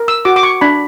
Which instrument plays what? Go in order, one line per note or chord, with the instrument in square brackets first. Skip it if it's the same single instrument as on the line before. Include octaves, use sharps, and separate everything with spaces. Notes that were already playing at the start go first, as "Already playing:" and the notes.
Already playing: [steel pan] A#4
E6
F#4 D6
D6
C#6
D4 B5